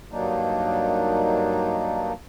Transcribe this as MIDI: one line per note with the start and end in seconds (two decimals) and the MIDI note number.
0.11 2.12 43
0.11 2.12 51
0.11 2.12 54
0.11 2.12 58
0.11 2.12 62
0.11 2.12 63